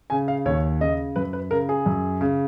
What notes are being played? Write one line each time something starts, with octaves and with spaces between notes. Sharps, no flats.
C#3 G#5
F5
D#2 C#5
C#3 D#5
F#2 B4
B4
C#3 A#4
G#4
F#2
C#3